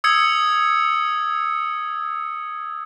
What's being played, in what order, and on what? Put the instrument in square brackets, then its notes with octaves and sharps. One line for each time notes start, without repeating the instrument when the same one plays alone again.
[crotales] D#6 E6 G#6 C#7